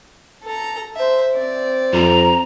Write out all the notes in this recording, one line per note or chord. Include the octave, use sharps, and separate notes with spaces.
A4 A#5
C5 E5
C4 D5
F2 A#5